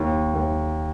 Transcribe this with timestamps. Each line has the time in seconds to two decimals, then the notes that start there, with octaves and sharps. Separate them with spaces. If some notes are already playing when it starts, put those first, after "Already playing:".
Already playing: D#2
0.34 D#2